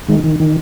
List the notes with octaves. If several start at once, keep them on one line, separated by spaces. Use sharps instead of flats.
D#3 G#3
D#3
D#3